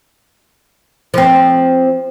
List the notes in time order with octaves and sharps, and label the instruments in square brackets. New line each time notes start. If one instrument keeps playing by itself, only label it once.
[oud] F3 C4